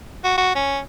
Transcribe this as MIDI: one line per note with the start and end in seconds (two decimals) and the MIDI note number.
0.24 0.37 66
0.38 0.53 66
0.55 0.80 61